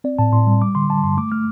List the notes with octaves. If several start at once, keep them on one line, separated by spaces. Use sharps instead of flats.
C4 D5
A2 A5
A2 C6
G3
G3 D6
D3 C6
G3 A5
G2 C6
A3 D6
A3 F6